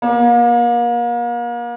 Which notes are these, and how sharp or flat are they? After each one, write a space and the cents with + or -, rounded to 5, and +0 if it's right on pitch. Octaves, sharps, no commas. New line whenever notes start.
A#3 +35